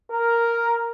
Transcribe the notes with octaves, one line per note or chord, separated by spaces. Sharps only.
A#4